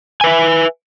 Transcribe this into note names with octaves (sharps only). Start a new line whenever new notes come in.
B4 E5 G#5